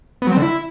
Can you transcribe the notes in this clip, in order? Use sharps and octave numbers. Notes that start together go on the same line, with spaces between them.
B3
F#3
C4
D3
E4